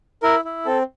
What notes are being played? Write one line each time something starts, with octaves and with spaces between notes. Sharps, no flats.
E4 A#4
E4
C4 A4